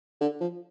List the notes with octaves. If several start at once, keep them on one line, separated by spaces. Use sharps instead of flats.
D3
F3